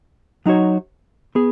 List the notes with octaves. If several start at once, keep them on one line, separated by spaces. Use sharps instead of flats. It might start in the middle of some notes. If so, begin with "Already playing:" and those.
F#3 D#4 F#4 C#5
B3 G#4